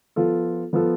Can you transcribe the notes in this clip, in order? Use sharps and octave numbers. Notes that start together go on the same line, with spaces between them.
F3 B3 F4 A4
F3 B3 F4 A4